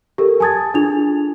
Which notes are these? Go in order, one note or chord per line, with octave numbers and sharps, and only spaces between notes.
G4 A4 A#4
G#5 A5 D#6 G#6 A6
D4 F4 G#4 F7